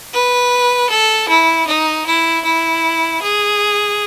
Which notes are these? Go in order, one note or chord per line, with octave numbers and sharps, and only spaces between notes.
B4
A4
E4
D#4
E4
E4
G#4